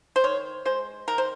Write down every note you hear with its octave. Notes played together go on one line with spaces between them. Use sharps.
C5
D#3 C#5
G#3 C5
D#3 A#4
C5